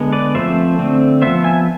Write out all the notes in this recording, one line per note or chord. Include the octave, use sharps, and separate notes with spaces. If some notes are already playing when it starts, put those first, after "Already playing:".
Already playing: D3 G#3 B3
B4 D5
F3 A3 C4 C5 E5
D3 A3 C4
F3 B3 C5 E5
E5 G#5